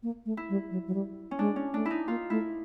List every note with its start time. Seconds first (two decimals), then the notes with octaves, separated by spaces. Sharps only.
0.03 A#3
0.25 A3
0.37 E4
0.49 G3
0.71 F#3
0.87 F#3
0.94 G3
1.31 C#4
1.39 G#3 D4
1.56 C#4
1.74 A3 D4
1.86 D#4 E4
2.08 A#3 F4
2.30 A3 E4